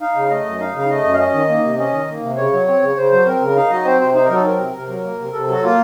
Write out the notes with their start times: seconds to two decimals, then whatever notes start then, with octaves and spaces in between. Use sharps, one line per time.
0.01 D#4 F5
0.16 C#3
0.30 A3 D#5
0.45 F#2
0.60 D#4 F5
0.75 C#3 F5
0.90 A3 D#5
1.04 F#2
1.14 F5
1.19 C#4 D#5
1.34 D#3
1.49 A#3
1.63 C3
1.78 C#4 D#5
1.93 D#3
2.08 A#3
2.22 C3
2.37 C#3 C#5
2.53 F#3
2.67 C4 C#5
2.82 C#3
2.97 C#3 C5
3.12 F#3
3.26 C4 A#4
3.41 C#3
3.56 D#4 F5
3.70 F#3 D#5
3.85 C4 C5
4.00 C3 C5
4.14 D#4 C5
4.25 A#4
4.30 F#3
4.36 A4
4.45 C4 A#4
4.59 C3
4.74 C3
4.88 F#3
5.03 A#3
5.18 C3
5.33 C3 A4
5.47 F#3
5.53 F#4
5.63 A#3 F4